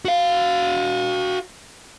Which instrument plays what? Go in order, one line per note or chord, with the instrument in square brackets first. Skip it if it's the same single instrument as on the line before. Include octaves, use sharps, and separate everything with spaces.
[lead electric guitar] F#4 F5